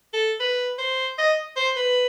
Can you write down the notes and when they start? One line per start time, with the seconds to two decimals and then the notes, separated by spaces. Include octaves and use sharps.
0.13 A4
0.40 B4
0.79 C5
1.18 D#5
1.56 C5
1.77 B4